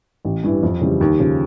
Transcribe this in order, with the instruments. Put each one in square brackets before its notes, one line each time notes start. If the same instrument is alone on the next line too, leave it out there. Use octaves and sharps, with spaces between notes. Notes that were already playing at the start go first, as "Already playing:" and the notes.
[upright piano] A1
G2 E3
F2
C#3 E3 G3
D#2
C#3 F3